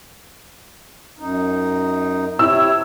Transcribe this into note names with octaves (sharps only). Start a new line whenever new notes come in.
F#2 D#4
C3 E4 C#5 E6